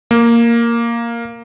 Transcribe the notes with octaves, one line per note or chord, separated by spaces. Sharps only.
A#3